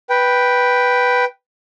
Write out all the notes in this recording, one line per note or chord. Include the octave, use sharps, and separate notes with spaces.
B4 G5